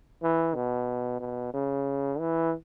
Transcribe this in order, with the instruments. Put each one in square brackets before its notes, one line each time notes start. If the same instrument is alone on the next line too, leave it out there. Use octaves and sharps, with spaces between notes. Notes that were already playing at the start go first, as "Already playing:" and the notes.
[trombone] E3
B2
B2
C#3
E3